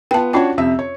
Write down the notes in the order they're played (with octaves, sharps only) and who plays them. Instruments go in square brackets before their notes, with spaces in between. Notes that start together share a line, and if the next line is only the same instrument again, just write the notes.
[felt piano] B3 F4 [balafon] G5 A5
[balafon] C#4 F4 G5 [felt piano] D4 F#4 C#5
[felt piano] F2 C3 E5
C#5